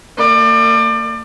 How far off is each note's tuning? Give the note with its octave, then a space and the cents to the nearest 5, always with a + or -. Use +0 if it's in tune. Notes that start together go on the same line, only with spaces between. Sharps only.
A#3 -45 D5 +30